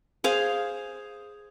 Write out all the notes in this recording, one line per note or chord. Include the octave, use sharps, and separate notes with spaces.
G#4 C5 F5